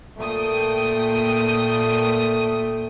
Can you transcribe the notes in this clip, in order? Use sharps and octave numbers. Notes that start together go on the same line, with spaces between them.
A#2 A3 G5 D#6